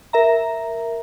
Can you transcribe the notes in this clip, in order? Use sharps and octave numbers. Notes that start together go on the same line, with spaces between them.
A#4 E5 A#5